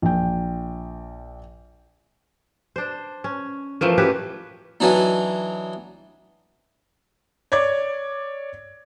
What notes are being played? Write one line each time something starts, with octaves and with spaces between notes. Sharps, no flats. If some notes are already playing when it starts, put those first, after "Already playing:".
A#1 G5
D4 C5
C#4
E3 F3 A3 A#3
C#4 F#4 G4 B4
E3 F#3 D4 D#4
C#5 D5 D6 G#6